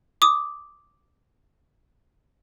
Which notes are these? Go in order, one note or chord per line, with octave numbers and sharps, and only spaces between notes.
D6 D#6